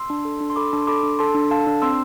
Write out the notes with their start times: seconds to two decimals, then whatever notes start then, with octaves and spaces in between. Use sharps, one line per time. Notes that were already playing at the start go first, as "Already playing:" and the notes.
Already playing: C6 E6
0.10 D4
0.25 A4
0.41 D4
0.50 C6
0.56 A4 B5 D6
0.73 D4
0.81 C6
0.87 A4 B5 D6
1.03 D4
1.19 A4 A5 C6
1.35 D4
1.50 A4 F5 A5
1.67 D4
1.82 C4 C6 E6